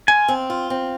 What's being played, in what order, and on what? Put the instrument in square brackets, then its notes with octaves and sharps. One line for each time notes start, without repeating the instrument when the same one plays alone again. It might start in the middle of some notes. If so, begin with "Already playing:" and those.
[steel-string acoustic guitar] F4 [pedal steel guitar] G#5
[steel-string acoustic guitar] C4
F4
C4